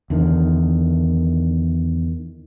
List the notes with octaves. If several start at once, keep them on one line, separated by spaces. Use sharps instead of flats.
E2 D3 D#3